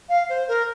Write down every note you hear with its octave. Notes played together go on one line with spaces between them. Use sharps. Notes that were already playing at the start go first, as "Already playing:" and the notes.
F5
C5
A#4